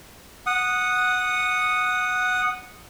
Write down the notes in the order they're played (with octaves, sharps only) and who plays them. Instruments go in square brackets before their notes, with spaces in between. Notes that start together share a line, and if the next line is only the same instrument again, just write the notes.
[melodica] F#5 D#6